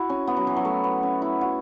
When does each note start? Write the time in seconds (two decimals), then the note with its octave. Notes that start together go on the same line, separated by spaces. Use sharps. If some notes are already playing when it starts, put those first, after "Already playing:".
Already playing: E4 F#4
0.09 C#4
0.27 B3
0.37 F#3
0.47 E3
0.57 F#3
0.65 A3
0.84 B3
1.03 C#4
1.22 E4
1.41 F#4